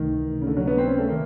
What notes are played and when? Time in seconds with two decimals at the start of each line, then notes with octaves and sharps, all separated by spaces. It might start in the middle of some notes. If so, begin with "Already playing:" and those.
Already playing: C#2 C3 D#3 E3 A3
0.41 C#3
0.47 D3
0.57 F#3
0.67 B3
0.78 C4
0.88 C#4
0.98 A3
1.09 D#3 A#3